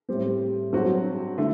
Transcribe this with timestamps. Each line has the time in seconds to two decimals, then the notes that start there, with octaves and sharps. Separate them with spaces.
0.09 A2 G3 C4
0.73 G2 F#3 C4 F#4
1.38 D3 A3 E4